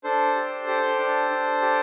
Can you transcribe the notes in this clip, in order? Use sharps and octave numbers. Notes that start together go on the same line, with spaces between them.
D4 A4 C5
G4
G4
D4
D4
G4